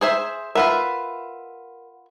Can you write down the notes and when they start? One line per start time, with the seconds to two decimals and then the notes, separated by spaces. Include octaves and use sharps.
0.01 G#4 C5 E5
0.55 F4 A#4 B4 E5 F#5